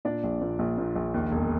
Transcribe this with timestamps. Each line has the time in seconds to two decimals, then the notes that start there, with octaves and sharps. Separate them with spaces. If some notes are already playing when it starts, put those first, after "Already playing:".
0.05 A#2 D4 D5
0.24 A#1
0.41 A#2
0.59 A#1
0.78 A#2
0.96 A#1
1.14 D#2
1.32 E1